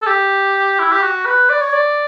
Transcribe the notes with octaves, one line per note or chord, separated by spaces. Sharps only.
A4
G4
E4
G4
F#4
B4
D5
C#5
D5